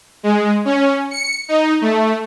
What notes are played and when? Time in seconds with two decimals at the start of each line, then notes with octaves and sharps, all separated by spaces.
0.23 G#3
0.65 C#4
1.11 C#7
1.48 D#4
1.81 A3